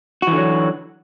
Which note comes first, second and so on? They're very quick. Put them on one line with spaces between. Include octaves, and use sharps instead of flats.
F#4 E3 D3 F#3